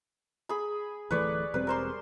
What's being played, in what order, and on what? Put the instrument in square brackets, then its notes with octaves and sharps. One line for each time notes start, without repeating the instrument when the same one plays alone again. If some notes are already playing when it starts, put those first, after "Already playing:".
[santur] G#4 B5
[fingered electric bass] D1 E3 A3 [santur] B4 C#5 D5
[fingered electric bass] E1 G3 C4 [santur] B4
[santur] A#4 C5 C6